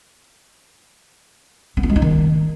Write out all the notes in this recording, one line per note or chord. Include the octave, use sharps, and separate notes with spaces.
B3
F4
G#3
D#4
D#3